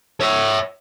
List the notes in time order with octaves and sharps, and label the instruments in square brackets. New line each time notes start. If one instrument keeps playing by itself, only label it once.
[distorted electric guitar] C#5 E5